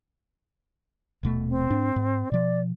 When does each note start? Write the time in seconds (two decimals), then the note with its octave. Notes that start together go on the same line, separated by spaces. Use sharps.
1.23 D#1 B2 A3
1.49 C4
1.70 G#2 D4
1.96 G#2
2.32 B2 F3 D5